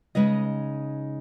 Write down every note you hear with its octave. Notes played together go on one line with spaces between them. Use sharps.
C#3 G#3 D#4 B4 D#5